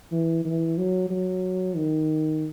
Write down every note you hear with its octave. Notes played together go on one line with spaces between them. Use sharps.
E3
E3
F#3
F#3
D#3